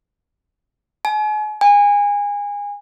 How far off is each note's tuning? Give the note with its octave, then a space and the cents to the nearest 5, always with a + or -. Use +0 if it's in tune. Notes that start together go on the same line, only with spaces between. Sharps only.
G#5 +40
G#5 -25